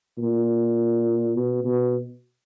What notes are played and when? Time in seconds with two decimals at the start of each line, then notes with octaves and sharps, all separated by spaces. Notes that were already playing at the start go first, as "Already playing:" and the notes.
0.18 A#2
1.36 B2
1.64 B2